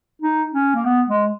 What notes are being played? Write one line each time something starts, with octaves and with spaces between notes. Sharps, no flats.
D#4
C#4
A#3
B3
G#3